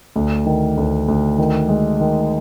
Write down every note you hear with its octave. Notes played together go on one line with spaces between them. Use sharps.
D2
D#3
D2
D2
D#3
G#3
D#3